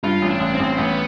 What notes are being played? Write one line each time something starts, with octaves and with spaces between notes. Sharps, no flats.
G2 F4
A1
D4
A1
C4
A1
A1 B3